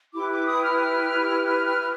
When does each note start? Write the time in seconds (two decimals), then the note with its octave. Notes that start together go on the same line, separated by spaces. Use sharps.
0.14 E4 G4 B4 D6
0.30 D6
0.46 D#6
0.63 F6
1.45 F6
1.66 F6
1.81 F6